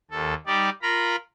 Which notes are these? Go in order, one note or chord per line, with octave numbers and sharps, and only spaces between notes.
D#2 A4
G3 D#4 G4 D5
F4 A#4 A#5 B5